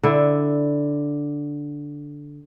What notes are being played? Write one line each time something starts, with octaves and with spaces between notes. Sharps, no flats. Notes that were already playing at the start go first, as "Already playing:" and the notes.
D3 E4